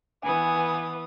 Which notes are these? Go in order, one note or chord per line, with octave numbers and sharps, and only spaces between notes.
E3 B3 G#5 D#6